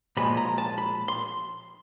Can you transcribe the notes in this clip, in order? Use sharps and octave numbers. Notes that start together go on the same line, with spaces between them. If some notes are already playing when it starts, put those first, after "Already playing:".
A#2 F3 G#3 B5
A#5
A5
B5
C6